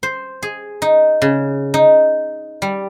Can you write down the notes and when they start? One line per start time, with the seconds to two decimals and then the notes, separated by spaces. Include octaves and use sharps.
0.03 C5
0.42 G#4
0.82 D#4
1.22 C#3
1.74 D#4
2.62 G3